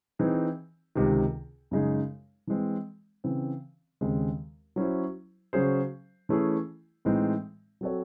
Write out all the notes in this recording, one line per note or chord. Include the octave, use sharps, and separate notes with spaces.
E3 C4 D#4 G#4
C#2 C3 D#3
F#2 C#3 G#3 D#4 G#4
E3 G#3 C4
C#3 E3 C4
D#2 C#3 G#3 C4
F#3 C#4 E4 C5
C#3 F#3 C#4 G#4 C5
E3 A3 C#4 E4 G#4
A2 E3 G#3 C4 D#4
F#3 C4 F#4 A4 C#5